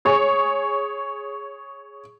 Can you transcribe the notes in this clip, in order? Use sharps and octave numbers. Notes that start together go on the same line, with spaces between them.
G#4 C#5